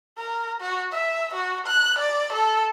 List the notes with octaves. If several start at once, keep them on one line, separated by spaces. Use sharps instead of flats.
A#4
F#4
E5
F#4
F#6
D5
A4